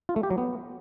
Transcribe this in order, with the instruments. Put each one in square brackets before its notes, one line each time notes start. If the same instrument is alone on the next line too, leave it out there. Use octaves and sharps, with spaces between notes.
[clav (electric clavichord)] F4
A3
G4
F#3
B3